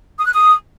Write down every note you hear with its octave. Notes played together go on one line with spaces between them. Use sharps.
D#6
F#6
D#6